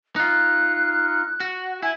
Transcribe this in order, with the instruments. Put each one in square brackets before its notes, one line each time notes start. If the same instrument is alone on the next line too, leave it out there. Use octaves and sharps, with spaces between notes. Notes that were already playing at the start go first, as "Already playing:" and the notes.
[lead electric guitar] D#4 F4 [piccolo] F#6
[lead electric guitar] F#4
[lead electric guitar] E4 [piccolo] G#5